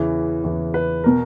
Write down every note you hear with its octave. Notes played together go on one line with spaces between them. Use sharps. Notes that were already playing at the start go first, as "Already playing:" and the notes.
Already playing: E2 C#3 E3
E2 C#3 E3
B4
B2 A#4